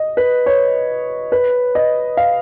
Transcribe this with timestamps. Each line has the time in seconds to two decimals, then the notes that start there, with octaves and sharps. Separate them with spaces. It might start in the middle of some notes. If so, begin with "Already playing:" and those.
Already playing: D#5
0.17 B4
0.46 C#5
1.32 B4
1.75 D#5
2.17 F5